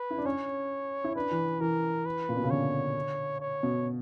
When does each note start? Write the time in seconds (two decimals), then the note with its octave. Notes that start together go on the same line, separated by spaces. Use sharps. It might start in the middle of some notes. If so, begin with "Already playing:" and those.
Already playing: B4
0.10 E4
0.18 D4
0.25 C#4 C#5
1.04 E4
1.16 D4 B4
1.31 E3
1.60 E3 A#4
2.05 B4
2.29 A#2
2.36 B2
2.43 C#3
2.51 D3 C#5
3.41 C#5
3.63 B2